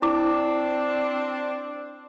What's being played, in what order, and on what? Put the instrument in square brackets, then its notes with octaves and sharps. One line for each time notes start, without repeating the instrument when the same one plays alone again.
[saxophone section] C4 D4 [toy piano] E4 D6